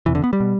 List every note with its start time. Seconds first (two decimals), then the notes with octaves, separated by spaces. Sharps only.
0.06 E1 E2 C3 E3
0.15 D3
0.24 B3
0.33 G3
0.40 B2